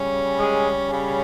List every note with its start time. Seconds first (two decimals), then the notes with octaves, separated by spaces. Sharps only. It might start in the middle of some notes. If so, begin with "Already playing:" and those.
Already playing: C#3 G3 C#4
0.39 G#3 G#4
0.88 C#3 G3 C#4